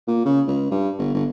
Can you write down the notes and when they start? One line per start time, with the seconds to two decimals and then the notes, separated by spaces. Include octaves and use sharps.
0.07 A#2
0.25 C#3
0.47 C#2
0.71 G2
0.98 G1
1.14 G1